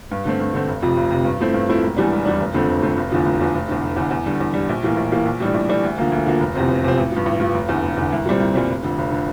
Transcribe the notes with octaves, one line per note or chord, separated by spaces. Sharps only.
G2
D3 A3 C4
G2
D3 A3 C4
F1
F2 C3 F3
F1
F2 C3 F3
G2
F3 A3 C4 E4
G2
F3 A3 C4 E4
E1
E2 E3 G3 D4
E1
E2 E3 G3 D4
F1
F2 D3 A3 C4
F1
F2 D3 A3 C4
F1
E2 D3 F3
F1
E2 D3 F3
F1
E2 D3
F1
E2 D3
E2
D3 G3
E2
D3 G3
A#1
A2 E3 A#3
A#1
A2 E3 A#3
A#1
A2 E3 G3 D4
A#1
A2 E3 G3 D4
D2
D3 F3 A#3 F4
D2
D3 F3 A#3 F4
F1
E2 C3 F3 C4
F1
E2 C3 F3 C4
A1
G2 F3
A1
G2 F3
F1
E2 D3
F1
E2 D3
C2
A#2 G3 C4
C2
A#2 G3 C4
F1
F2 D3
F1
D3